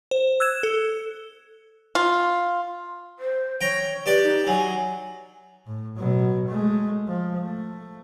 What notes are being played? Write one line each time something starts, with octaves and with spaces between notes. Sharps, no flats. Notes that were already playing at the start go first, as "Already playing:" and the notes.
C5
E6 F#6 G#6 E7
A4
F4
C5
C#5 G5 A#5
G4 B4 D5 A5
D#4
F#3 G#5
A2
B2 F#3
G#3 A3
F3
A3